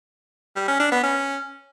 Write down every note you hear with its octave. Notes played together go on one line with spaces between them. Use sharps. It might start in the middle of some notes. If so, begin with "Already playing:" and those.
G3
C#4
D4
B3
C#4